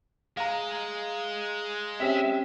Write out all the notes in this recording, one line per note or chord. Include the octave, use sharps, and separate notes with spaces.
G#3 F5 A#5
C4 C#4 G4 E5